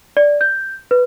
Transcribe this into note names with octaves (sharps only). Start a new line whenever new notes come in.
D5
G6
B4